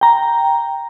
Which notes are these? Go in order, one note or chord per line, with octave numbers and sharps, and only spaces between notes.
G5 A#5